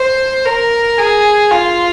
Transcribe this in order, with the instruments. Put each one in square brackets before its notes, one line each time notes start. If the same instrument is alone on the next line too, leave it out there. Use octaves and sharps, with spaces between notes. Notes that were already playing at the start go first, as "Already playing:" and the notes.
Already playing: [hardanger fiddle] C5
A#4
G#4
F4